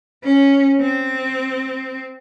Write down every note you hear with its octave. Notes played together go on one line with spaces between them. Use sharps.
C#4
C4